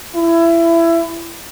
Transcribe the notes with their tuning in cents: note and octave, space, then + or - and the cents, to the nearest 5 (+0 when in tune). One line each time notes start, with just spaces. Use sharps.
E4 +20